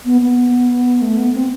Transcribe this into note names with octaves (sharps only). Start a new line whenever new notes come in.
B3
B3
A3
B3
C4